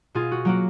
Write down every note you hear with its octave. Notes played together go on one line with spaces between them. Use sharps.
B2 F4 G#4
F#4
F#3 A#3 F#4